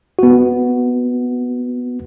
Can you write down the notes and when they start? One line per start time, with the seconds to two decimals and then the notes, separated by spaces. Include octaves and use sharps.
0.19 B3 F#4